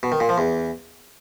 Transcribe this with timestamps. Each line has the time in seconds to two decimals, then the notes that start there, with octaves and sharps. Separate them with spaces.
0.03 B2
0.12 D#3
0.20 A#2
0.29 F3
0.38 E2